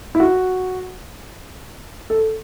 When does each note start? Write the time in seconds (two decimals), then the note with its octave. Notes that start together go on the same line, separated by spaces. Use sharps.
0.15 E4
0.20 F#4
2.10 A4